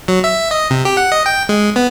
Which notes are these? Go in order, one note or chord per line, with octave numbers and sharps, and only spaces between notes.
F#3
E5
D#5
C3
G4
F#5
D#5
G5
G#3
B3